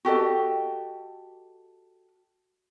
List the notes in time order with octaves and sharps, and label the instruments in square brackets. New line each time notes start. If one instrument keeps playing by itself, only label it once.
[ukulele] F#4 G4 A4 D#5